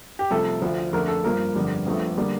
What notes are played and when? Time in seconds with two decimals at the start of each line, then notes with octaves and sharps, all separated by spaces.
0.19 G4
0.31 C2 C3 F3 A3 A4
0.62 D2 D3 F3
0.93 F2 D3 A3 A#4
1.08 A4
1.24 G2 F3 A#3 A#4
1.55 G1 F2 D3 G3
1.86 G1 F2 D3 F3 A3
2.17 D3 G3 A#3